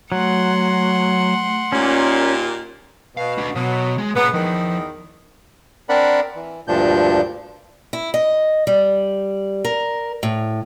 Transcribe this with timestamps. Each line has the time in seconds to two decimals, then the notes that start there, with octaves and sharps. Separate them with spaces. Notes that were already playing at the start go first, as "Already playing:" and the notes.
0.12 F#3 A3 F#5 C6
1.72 D#2 A#2 C#4
3.17 B2 F5
3.38 D4 F#4
3.55 B2 F#3
3.98 G#3
4.15 A#2 C#3 B3 A#5
4.33 E2 D#3 F3
5.89 C4 D4 A#4 D5 F#5 B5
6.35 E3
6.68 D2 G2 A#2 F3 D4 G6
7.93 E4
8.14 D#5
8.67 G3
9.65 A#4
10.23 A2